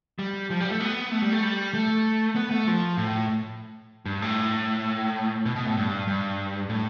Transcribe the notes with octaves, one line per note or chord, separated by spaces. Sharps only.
G3
F3
G3
A3
B3
A3
G3
A3
G3
A3
B3
A3
F3
A2
G2
A2
B2
B2
A2
G2
G2
A2